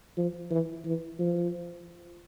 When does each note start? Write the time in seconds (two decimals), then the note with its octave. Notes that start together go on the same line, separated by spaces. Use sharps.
0.17 F3
0.51 E3
0.85 E3
1.19 F3